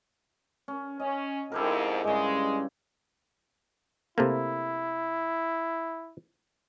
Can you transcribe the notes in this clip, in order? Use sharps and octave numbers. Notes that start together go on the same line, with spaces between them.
C#4
C#4 D#5
F2 G#2 E4 G4 A#4
G2 C#3 G#3
C3 A3 A#3 E4